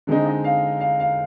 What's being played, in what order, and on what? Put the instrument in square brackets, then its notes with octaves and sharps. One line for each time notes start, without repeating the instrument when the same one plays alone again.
[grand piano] D3 G#3 C4 D#4
D#5
F5
F5
F5